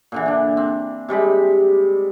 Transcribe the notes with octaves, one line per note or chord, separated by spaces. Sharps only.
A#2 D3 E3
D3 D4
C4
C3 G3 G#3 B5